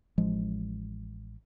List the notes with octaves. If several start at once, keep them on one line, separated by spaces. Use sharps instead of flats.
A1 F3 G#3